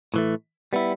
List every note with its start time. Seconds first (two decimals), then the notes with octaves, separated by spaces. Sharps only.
0.14 A2 E3 A3
0.73 G3 B3 E4